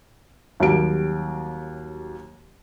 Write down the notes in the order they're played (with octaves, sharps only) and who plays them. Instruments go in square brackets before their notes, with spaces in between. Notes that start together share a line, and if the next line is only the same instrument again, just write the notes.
[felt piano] D#2 F#3 G3 D7